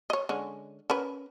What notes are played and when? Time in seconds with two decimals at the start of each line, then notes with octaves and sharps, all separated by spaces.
0.10 C#5 D#5
0.29 D3 G#3 C#4
0.90 C#4 A#4 B4